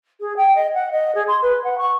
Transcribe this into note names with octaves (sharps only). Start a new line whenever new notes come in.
G#4
G5
D#5
F#5
D#5
G#4
C6
B4
F#5
C#6